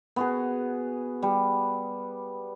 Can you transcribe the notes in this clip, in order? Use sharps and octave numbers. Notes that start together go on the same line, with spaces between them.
B3 F#4 G#4
G3